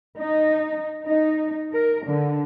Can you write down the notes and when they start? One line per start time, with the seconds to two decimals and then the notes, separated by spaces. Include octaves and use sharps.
0.20 D#4
1.05 D#4
1.73 A#4
2.07 D3